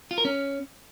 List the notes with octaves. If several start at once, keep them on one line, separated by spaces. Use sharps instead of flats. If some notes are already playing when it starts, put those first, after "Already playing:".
F4
A#4
C#4